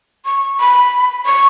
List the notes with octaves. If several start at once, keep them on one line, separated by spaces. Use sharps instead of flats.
C#6
B5
C#6